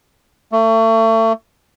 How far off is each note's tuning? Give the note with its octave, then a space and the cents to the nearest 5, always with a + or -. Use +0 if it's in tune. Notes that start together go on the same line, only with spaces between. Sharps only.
A3 +35